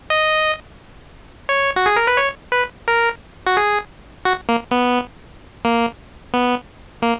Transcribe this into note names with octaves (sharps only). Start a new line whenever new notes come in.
D#5
C#5
F#4
G#4
A#4
B4
C#5
B4
A#4
F#4
G#4
F#4
A#3
B3
A#3
B3
A#3